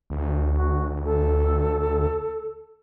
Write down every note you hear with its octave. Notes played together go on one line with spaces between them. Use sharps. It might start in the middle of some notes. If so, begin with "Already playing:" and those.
D2
F#4
A4